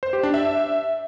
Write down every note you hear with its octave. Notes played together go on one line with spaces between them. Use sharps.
C5
G4
D4
E5